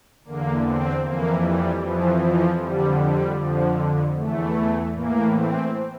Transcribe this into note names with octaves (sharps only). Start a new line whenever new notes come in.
E2 D3 A#3
C4
F2 E3 A#3
G3
F2 E3 F3
F3
F2 D3 G3
G3
F2 D3 F3
E2 E3 A3
A2 E3 A#3
C4